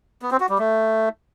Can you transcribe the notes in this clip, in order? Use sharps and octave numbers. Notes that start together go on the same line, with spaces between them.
B3
C4
F#4
G3
A3